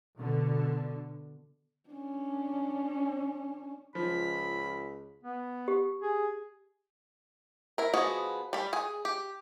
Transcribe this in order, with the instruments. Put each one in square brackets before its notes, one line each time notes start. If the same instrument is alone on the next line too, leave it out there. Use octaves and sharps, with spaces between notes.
[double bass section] B2 D3
[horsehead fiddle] C#4 D4
[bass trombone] C#2 [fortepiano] F3 [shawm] B5
[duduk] B3
[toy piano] G4
[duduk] G#4
[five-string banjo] E4 A#4
F3 B3 F#4 G#4 D#5
G3 B5
G#4 G#5
G4